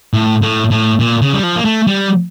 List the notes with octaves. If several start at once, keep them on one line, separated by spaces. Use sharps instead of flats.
A2
A2
A2
A#2
C#3
G3
F3
A#3
A3
G3